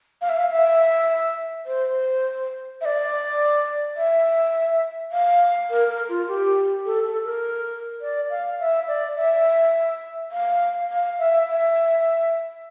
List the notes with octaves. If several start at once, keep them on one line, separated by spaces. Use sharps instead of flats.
F5
E5
F5
E5
C5
E5
D5
E5
F5
A#4
A#4
F4
G4
A4
A4
A#4
D5
F5
E5
D5
E5
F5
F5
E5
E5